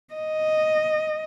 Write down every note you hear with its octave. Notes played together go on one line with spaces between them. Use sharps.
D#5